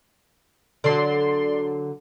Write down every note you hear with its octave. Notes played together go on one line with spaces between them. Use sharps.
D3 F#3 D5 C6